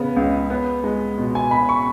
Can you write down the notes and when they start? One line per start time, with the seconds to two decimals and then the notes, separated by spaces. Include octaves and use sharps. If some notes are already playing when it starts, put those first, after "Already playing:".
Already playing: C#3 B3
0.17 C#2
0.50 B3
0.84 G#3
1.18 B2
1.35 G#5
1.51 B2 B5
1.69 C#6